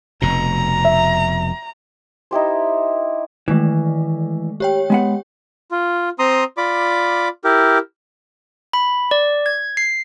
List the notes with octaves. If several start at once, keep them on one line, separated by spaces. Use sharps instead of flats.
F1 B2 A#5
E5
D#4 E4 G4 C5
D#3 E3 G#3 A3
G4 C#5 G5
G#3 B3 F#5
F4
C4 A#5 C6 D#6
F4 D5 B5 D6
E4 G4 A#4
B5
D5
G#6
C7